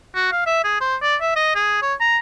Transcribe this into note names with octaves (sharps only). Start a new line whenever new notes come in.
F#4
F5
E5
G#4
C5
D5
E5
D#5
G#4
C#5
A#5